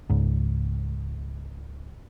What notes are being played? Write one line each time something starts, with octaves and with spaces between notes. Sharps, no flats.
C#2 G#2